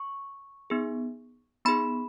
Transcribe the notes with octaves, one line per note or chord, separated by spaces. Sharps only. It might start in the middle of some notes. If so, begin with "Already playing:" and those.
Already playing: C#6
B3 D#4 G#4
B3 D#4 G#4 B5